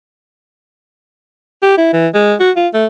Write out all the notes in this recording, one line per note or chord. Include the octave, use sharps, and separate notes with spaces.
G4
E4
E3
G#3
F#4
F4
A3